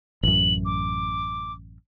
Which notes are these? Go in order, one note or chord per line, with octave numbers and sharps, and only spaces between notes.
A1 F#2 F#7
D6